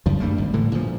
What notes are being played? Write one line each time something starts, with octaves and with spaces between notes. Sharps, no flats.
F#2 C#3 F3
G2 G3 A3 A#3
G#1
A2 D3 E3
A#2 D3 F3